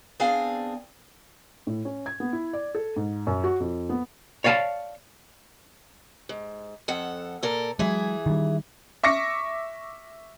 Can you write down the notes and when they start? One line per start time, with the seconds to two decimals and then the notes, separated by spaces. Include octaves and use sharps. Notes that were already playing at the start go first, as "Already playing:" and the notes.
0.20 B3 C4 D4 G#4 F5 G#5
1.67 A2
1.85 C#4
2.06 G#6
2.20 B3
2.33 E4
2.53 D5
2.75 A4
2.96 G#2
3.27 F#2
3.44 F#4
3.60 F2
3.90 B3
4.44 C#5 D5 F5 G#5 A5
6.29 G#2
6.88 F2 A4 F#5
7.43 A#2 A4 A#4
7.79 E3 F#3 G#3 G#4 E5
8.26 D#3 G3
9.03 E5 C#6 D6 A#6 C#7